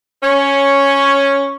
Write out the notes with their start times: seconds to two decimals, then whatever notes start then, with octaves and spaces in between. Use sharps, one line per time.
0.23 C#4 C#5